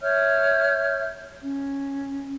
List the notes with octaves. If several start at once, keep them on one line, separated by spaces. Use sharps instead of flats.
C#5 E5 F6 G6
C#4